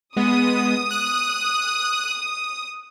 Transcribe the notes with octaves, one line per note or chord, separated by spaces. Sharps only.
G#3 B3 D#6
F#6